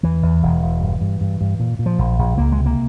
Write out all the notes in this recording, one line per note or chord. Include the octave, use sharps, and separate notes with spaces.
E2 E3
E2
E1
E1
G2
G2
G2
G2
A#2
A#2
F3
A#1
A#1
C#2 A#3
G#3
C3
A#3